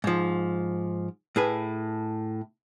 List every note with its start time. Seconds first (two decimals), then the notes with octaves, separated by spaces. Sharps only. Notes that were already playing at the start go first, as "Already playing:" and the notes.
0.04 G#2 F3
1.36 A2 G#4 B4